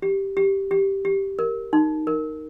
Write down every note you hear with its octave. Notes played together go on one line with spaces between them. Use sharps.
G4
G4
G4
G4
A#4
D#4
A#4